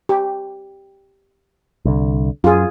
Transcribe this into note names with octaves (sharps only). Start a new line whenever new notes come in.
G4
C2 D3
F#2 F4 G#4